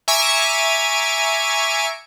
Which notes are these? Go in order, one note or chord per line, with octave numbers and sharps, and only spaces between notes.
E5 G#5 A#5 C#6 D6 D7